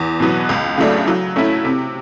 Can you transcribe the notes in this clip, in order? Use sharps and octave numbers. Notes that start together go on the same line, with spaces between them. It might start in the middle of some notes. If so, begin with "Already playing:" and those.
Already playing: E2
B2 F#3 B3
C#2
C#3 F#3 A3 D4
F#3
A3 C#4 E4
C3